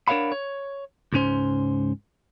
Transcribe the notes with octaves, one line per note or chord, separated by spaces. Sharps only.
D4 A#4 C#5 F5 F#5 B5
C#5
C#2 G#2 C#4 C5